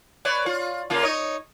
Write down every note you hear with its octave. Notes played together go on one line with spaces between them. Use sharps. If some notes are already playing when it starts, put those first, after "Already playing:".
B4 C#5 D5
F4
C#3 A#3 F4
D#4 C#5 D#5